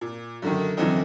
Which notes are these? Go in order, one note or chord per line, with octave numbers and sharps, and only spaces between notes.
A#2
F#2 D3 D#3
F#2 D3 E3 F3 C4 D#4